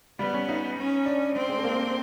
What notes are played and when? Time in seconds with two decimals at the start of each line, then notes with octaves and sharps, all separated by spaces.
0.19 G3 B3
0.34 C#4
0.49 D#4
0.77 C#4
1.06 D4
1.35 C4
1.49 G#3
1.57 A3
1.64 A#3